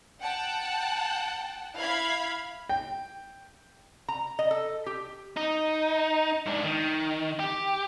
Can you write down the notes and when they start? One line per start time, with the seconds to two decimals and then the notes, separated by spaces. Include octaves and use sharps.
0.21 F#5 G5 A5
1.78 E4 F5 B5 G#6
2.69 G5
4.08 A#5
4.39 D#5
4.51 A4
4.86 G4
5.37 D#4
6.46 G#2 D4
6.64 D#3
7.39 G4